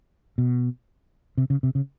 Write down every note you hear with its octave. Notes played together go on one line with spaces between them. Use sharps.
B2
C3
C#3
C3
C#3